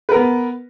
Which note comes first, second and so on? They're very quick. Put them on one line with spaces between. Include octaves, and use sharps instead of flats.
B4 A#4 B3